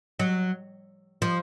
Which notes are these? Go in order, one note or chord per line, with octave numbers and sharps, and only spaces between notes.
F#3
F3